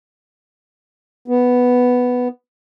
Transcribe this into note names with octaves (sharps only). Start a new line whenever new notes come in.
B3